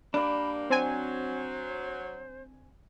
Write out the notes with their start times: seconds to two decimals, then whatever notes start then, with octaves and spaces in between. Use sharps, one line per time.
0.14 G3 A#3 D4 B5
0.70 F#3 C4 C5 G#5